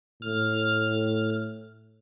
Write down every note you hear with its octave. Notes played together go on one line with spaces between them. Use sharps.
A2 F6